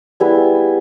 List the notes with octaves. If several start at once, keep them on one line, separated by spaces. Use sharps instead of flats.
G3 B3 E4 G#4